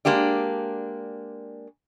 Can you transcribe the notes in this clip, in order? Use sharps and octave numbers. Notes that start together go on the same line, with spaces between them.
G#3 A#3 D4 G4 D5